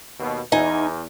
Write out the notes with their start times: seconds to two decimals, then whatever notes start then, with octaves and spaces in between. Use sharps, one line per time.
0.19 D#2 B2
0.52 E2 D#4 G#5